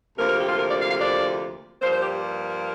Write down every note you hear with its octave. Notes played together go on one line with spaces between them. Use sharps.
D2 C3 F3 A#3 A#4
A#4
G4
F4
A#4
D5
F5
F5
D5
G2 F3 A#3 C5
C5
G4